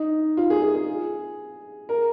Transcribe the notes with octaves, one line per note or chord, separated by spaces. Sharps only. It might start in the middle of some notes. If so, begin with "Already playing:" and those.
Already playing: D#4
F4
G#4
G#4
G#4
A#4